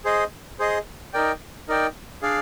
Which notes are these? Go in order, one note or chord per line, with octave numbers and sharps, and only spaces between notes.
G#4 C5 D#5
G#4 C5 D#5
D#4 A#4 D5 G5
D#4 A#4 D5 G5
D4 G#4 D5 F5